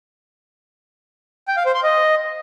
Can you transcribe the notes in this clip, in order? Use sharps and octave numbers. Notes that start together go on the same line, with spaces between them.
G5
F5
C5
C6
D#5